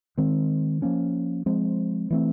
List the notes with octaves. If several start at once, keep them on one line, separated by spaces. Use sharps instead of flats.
D#3 G#3 C4
F3 A#3 C#4
F3 G#3 C4
E3 A3 C4